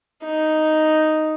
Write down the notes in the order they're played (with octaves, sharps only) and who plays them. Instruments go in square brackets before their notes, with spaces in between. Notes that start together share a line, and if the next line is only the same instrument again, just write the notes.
[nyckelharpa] D#4